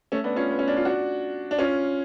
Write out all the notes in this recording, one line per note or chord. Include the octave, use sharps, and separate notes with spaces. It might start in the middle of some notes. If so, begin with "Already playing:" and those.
A3 C#4
B3 D4
C#4 F4
B3
C#4
D4
F4
D4 F#4
D4
C#4 F4